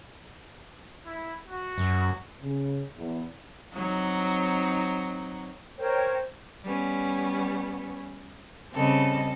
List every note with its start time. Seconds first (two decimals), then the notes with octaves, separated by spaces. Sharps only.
1.06 E4
1.46 F#4
1.78 F#2
2.41 C#3
2.97 E2
3.73 F#3 C4 D#4
5.79 A#4 C5 C#5 G5
6.64 G3 B3 C#4
8.72 C#3 G3 C4 A4 D#5